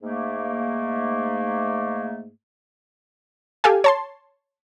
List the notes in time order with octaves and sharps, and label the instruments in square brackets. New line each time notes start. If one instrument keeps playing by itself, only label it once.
[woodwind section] G#2 A3 A#3
[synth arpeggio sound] G4 A4 F5 G#5
C#5 A5 C6